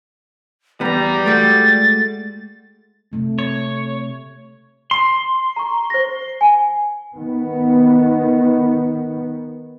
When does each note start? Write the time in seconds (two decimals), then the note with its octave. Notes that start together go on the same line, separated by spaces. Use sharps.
0.81 E2 G3 B3 A#5
1.26 G#3 A3 F#4 A6
3.12 C3 A3 C4
3.39 C#5
4.91 C6
5.56 A#5 C#6
5.90 C5 A#6
6.41 G#5
7.15 D#3 B3